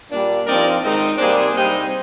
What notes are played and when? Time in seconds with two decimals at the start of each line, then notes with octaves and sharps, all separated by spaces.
0.10 A#2 G3 A#3 D4
0.46 G2 F3 C4 D#4 A#4 D5
0.82 G#2 D#3 G#3 C4 D#4
1.18 C3 G3 A#3 D4 G#4 C5
1.54 C3 G3 C4 D#4